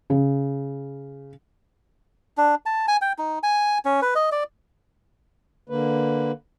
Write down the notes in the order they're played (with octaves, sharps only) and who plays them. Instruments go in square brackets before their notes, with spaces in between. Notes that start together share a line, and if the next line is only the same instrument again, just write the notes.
[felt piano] C#3
[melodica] D4
A5
G#5
G5
D#4
G#5
C#4
B4
D#5
D5
[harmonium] D3 A#3 B4